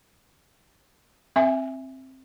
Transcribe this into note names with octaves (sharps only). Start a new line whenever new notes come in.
C4 E5 G#5